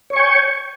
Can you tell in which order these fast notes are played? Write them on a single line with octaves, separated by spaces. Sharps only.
C#5 C#6 G#5 G5